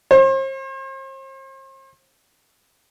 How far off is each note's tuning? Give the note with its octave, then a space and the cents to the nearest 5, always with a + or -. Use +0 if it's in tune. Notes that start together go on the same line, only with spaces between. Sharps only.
C5 +40